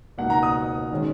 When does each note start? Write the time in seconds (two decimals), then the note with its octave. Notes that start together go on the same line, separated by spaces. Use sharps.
0.18 C#2 B2 A#3 D#4 F#5
0.30 A#5
0.43 D#6
0.92 D#3 G#3 C#4